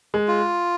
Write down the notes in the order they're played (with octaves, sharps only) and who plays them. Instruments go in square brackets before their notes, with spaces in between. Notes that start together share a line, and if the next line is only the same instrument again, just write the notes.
[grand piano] G#3
[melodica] F4